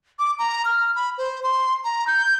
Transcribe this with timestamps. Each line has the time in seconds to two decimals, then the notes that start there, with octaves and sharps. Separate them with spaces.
0.19 D6
0.39 A#5
0.65 F6
0.95 B5
1.18 C5
1.43 C6
1.84 A#5
2.07 G6